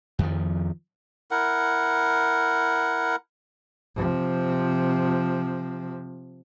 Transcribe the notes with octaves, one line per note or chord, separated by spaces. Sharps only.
F2 D#3 F3
E4 A#4 F#5
C3 F3